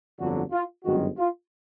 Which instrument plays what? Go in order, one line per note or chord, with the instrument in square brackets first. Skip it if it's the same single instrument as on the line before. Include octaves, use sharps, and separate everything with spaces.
[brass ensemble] G1 F2 D3 F#3 F#4
F4
G1 F#2 D#3 G#3 F#4
F4